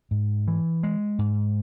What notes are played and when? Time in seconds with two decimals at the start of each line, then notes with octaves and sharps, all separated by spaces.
0.11 G#2
0.48 E3
0.83 G#3
1.19 G#2